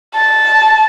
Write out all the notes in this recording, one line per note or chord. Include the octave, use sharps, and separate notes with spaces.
A5